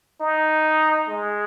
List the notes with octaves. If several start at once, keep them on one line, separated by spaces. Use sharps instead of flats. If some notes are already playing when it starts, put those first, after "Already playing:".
D#4
G#3